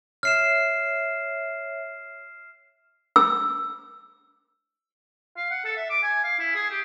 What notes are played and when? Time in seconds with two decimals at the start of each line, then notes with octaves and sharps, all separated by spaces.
0.23 C#5 E5 F6 C7 E7
3.16 E6
5.36 F5
5.50 F#5
5.65 A4
5.76 E5
5.90 D6
6.03 G#5
6.24 F5
6.39 E4
6.55 G#4
6.70 G4